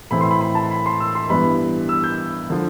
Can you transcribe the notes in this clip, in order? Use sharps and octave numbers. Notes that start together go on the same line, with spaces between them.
A2 E3 A3 C4 B5
C6
B5
B5
A5
B5
C6
E6
C6
G2 E3 B3 B5
E6
G6
D3 F3